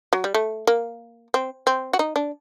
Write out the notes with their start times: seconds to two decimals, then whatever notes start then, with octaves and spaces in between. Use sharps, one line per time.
0.13 F#3
0.24 G3
0.34 A3
0.67 A#3
1.34 C4
1.67 C4
1.93 F#4
1.99 D#4
2.16 D4